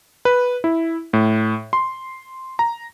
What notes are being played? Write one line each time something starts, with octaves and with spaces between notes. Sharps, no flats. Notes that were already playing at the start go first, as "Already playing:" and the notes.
B4
E4
A2
C6
A#5